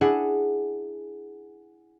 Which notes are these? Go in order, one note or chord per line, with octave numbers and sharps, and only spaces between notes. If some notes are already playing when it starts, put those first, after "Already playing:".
D4 E4 G#4 F#5